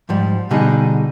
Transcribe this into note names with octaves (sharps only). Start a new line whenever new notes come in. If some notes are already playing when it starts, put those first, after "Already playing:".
G#2 F3 G3
B2 D3 G3 D4 D#4 G#4